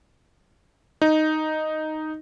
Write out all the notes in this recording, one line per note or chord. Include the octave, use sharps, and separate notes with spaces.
D#4